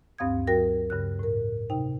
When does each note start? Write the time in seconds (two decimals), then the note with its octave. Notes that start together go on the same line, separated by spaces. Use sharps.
0.18 D2 G2 C4 F5 D#6 G#6
0.47 F#3 F#4 A#4 G5 A#6
0.90 G2 C#3 F#6
1.19 A2 A#4
1.70 C3 D#4 G5